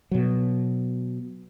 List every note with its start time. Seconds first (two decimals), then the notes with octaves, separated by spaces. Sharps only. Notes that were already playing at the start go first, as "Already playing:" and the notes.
0.11 B2 F#3